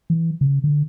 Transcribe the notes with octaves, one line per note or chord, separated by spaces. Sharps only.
E3
C#3
D3